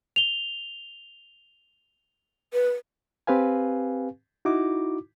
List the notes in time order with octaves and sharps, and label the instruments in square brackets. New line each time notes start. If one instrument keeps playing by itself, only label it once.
[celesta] F7 G7
[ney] B4
[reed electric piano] C4 G4 B4 F5 G#5
D#4 E4 F#4 D6